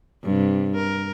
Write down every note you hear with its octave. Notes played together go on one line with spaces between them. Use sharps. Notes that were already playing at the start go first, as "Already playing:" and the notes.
G2 C3
A#4